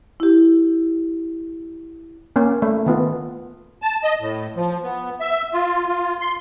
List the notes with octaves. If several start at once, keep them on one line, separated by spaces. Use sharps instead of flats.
E4 G4
A#3 C#4
A3
D#3 B3 F4
A5
D#5
A2
F3
B3
E5
F4
F4
C6